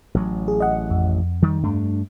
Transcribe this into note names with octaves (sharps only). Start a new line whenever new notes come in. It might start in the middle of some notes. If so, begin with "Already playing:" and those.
A1 F#3
G#4
D#5 F#5
F2
D#3 G3
G2 A3 D4